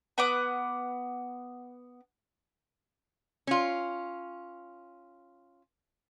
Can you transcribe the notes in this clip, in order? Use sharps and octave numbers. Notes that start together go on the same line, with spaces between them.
B3 F#5 D6
C#4 F4